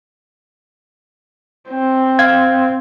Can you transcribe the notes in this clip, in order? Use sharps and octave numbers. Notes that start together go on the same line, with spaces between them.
C4
F5 G#6